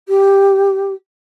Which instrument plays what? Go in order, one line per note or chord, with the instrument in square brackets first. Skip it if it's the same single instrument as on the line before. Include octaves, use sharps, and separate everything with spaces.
[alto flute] G4